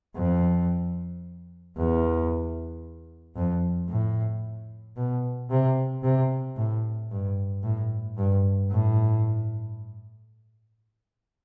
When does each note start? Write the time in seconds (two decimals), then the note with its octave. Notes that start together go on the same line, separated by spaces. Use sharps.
0.16 F2
1.76 E2
3.36 F2
3.89 A2
4.97 B2
5.50 C3
6.03 C3
6.57 A2
7.11 G2
7.63 A2
8.17 G2
8.70 A2